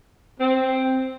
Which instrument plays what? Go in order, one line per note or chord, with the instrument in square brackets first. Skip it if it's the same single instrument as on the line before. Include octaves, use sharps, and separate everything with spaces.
[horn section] C4